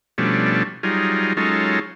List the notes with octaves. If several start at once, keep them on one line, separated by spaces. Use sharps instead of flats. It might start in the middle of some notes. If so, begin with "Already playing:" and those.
B2 F3 G3 A3 C#4 D4
F#3 G3 D#4 F4 G#4
F#3 G#3 C#4 D#4 F4 A4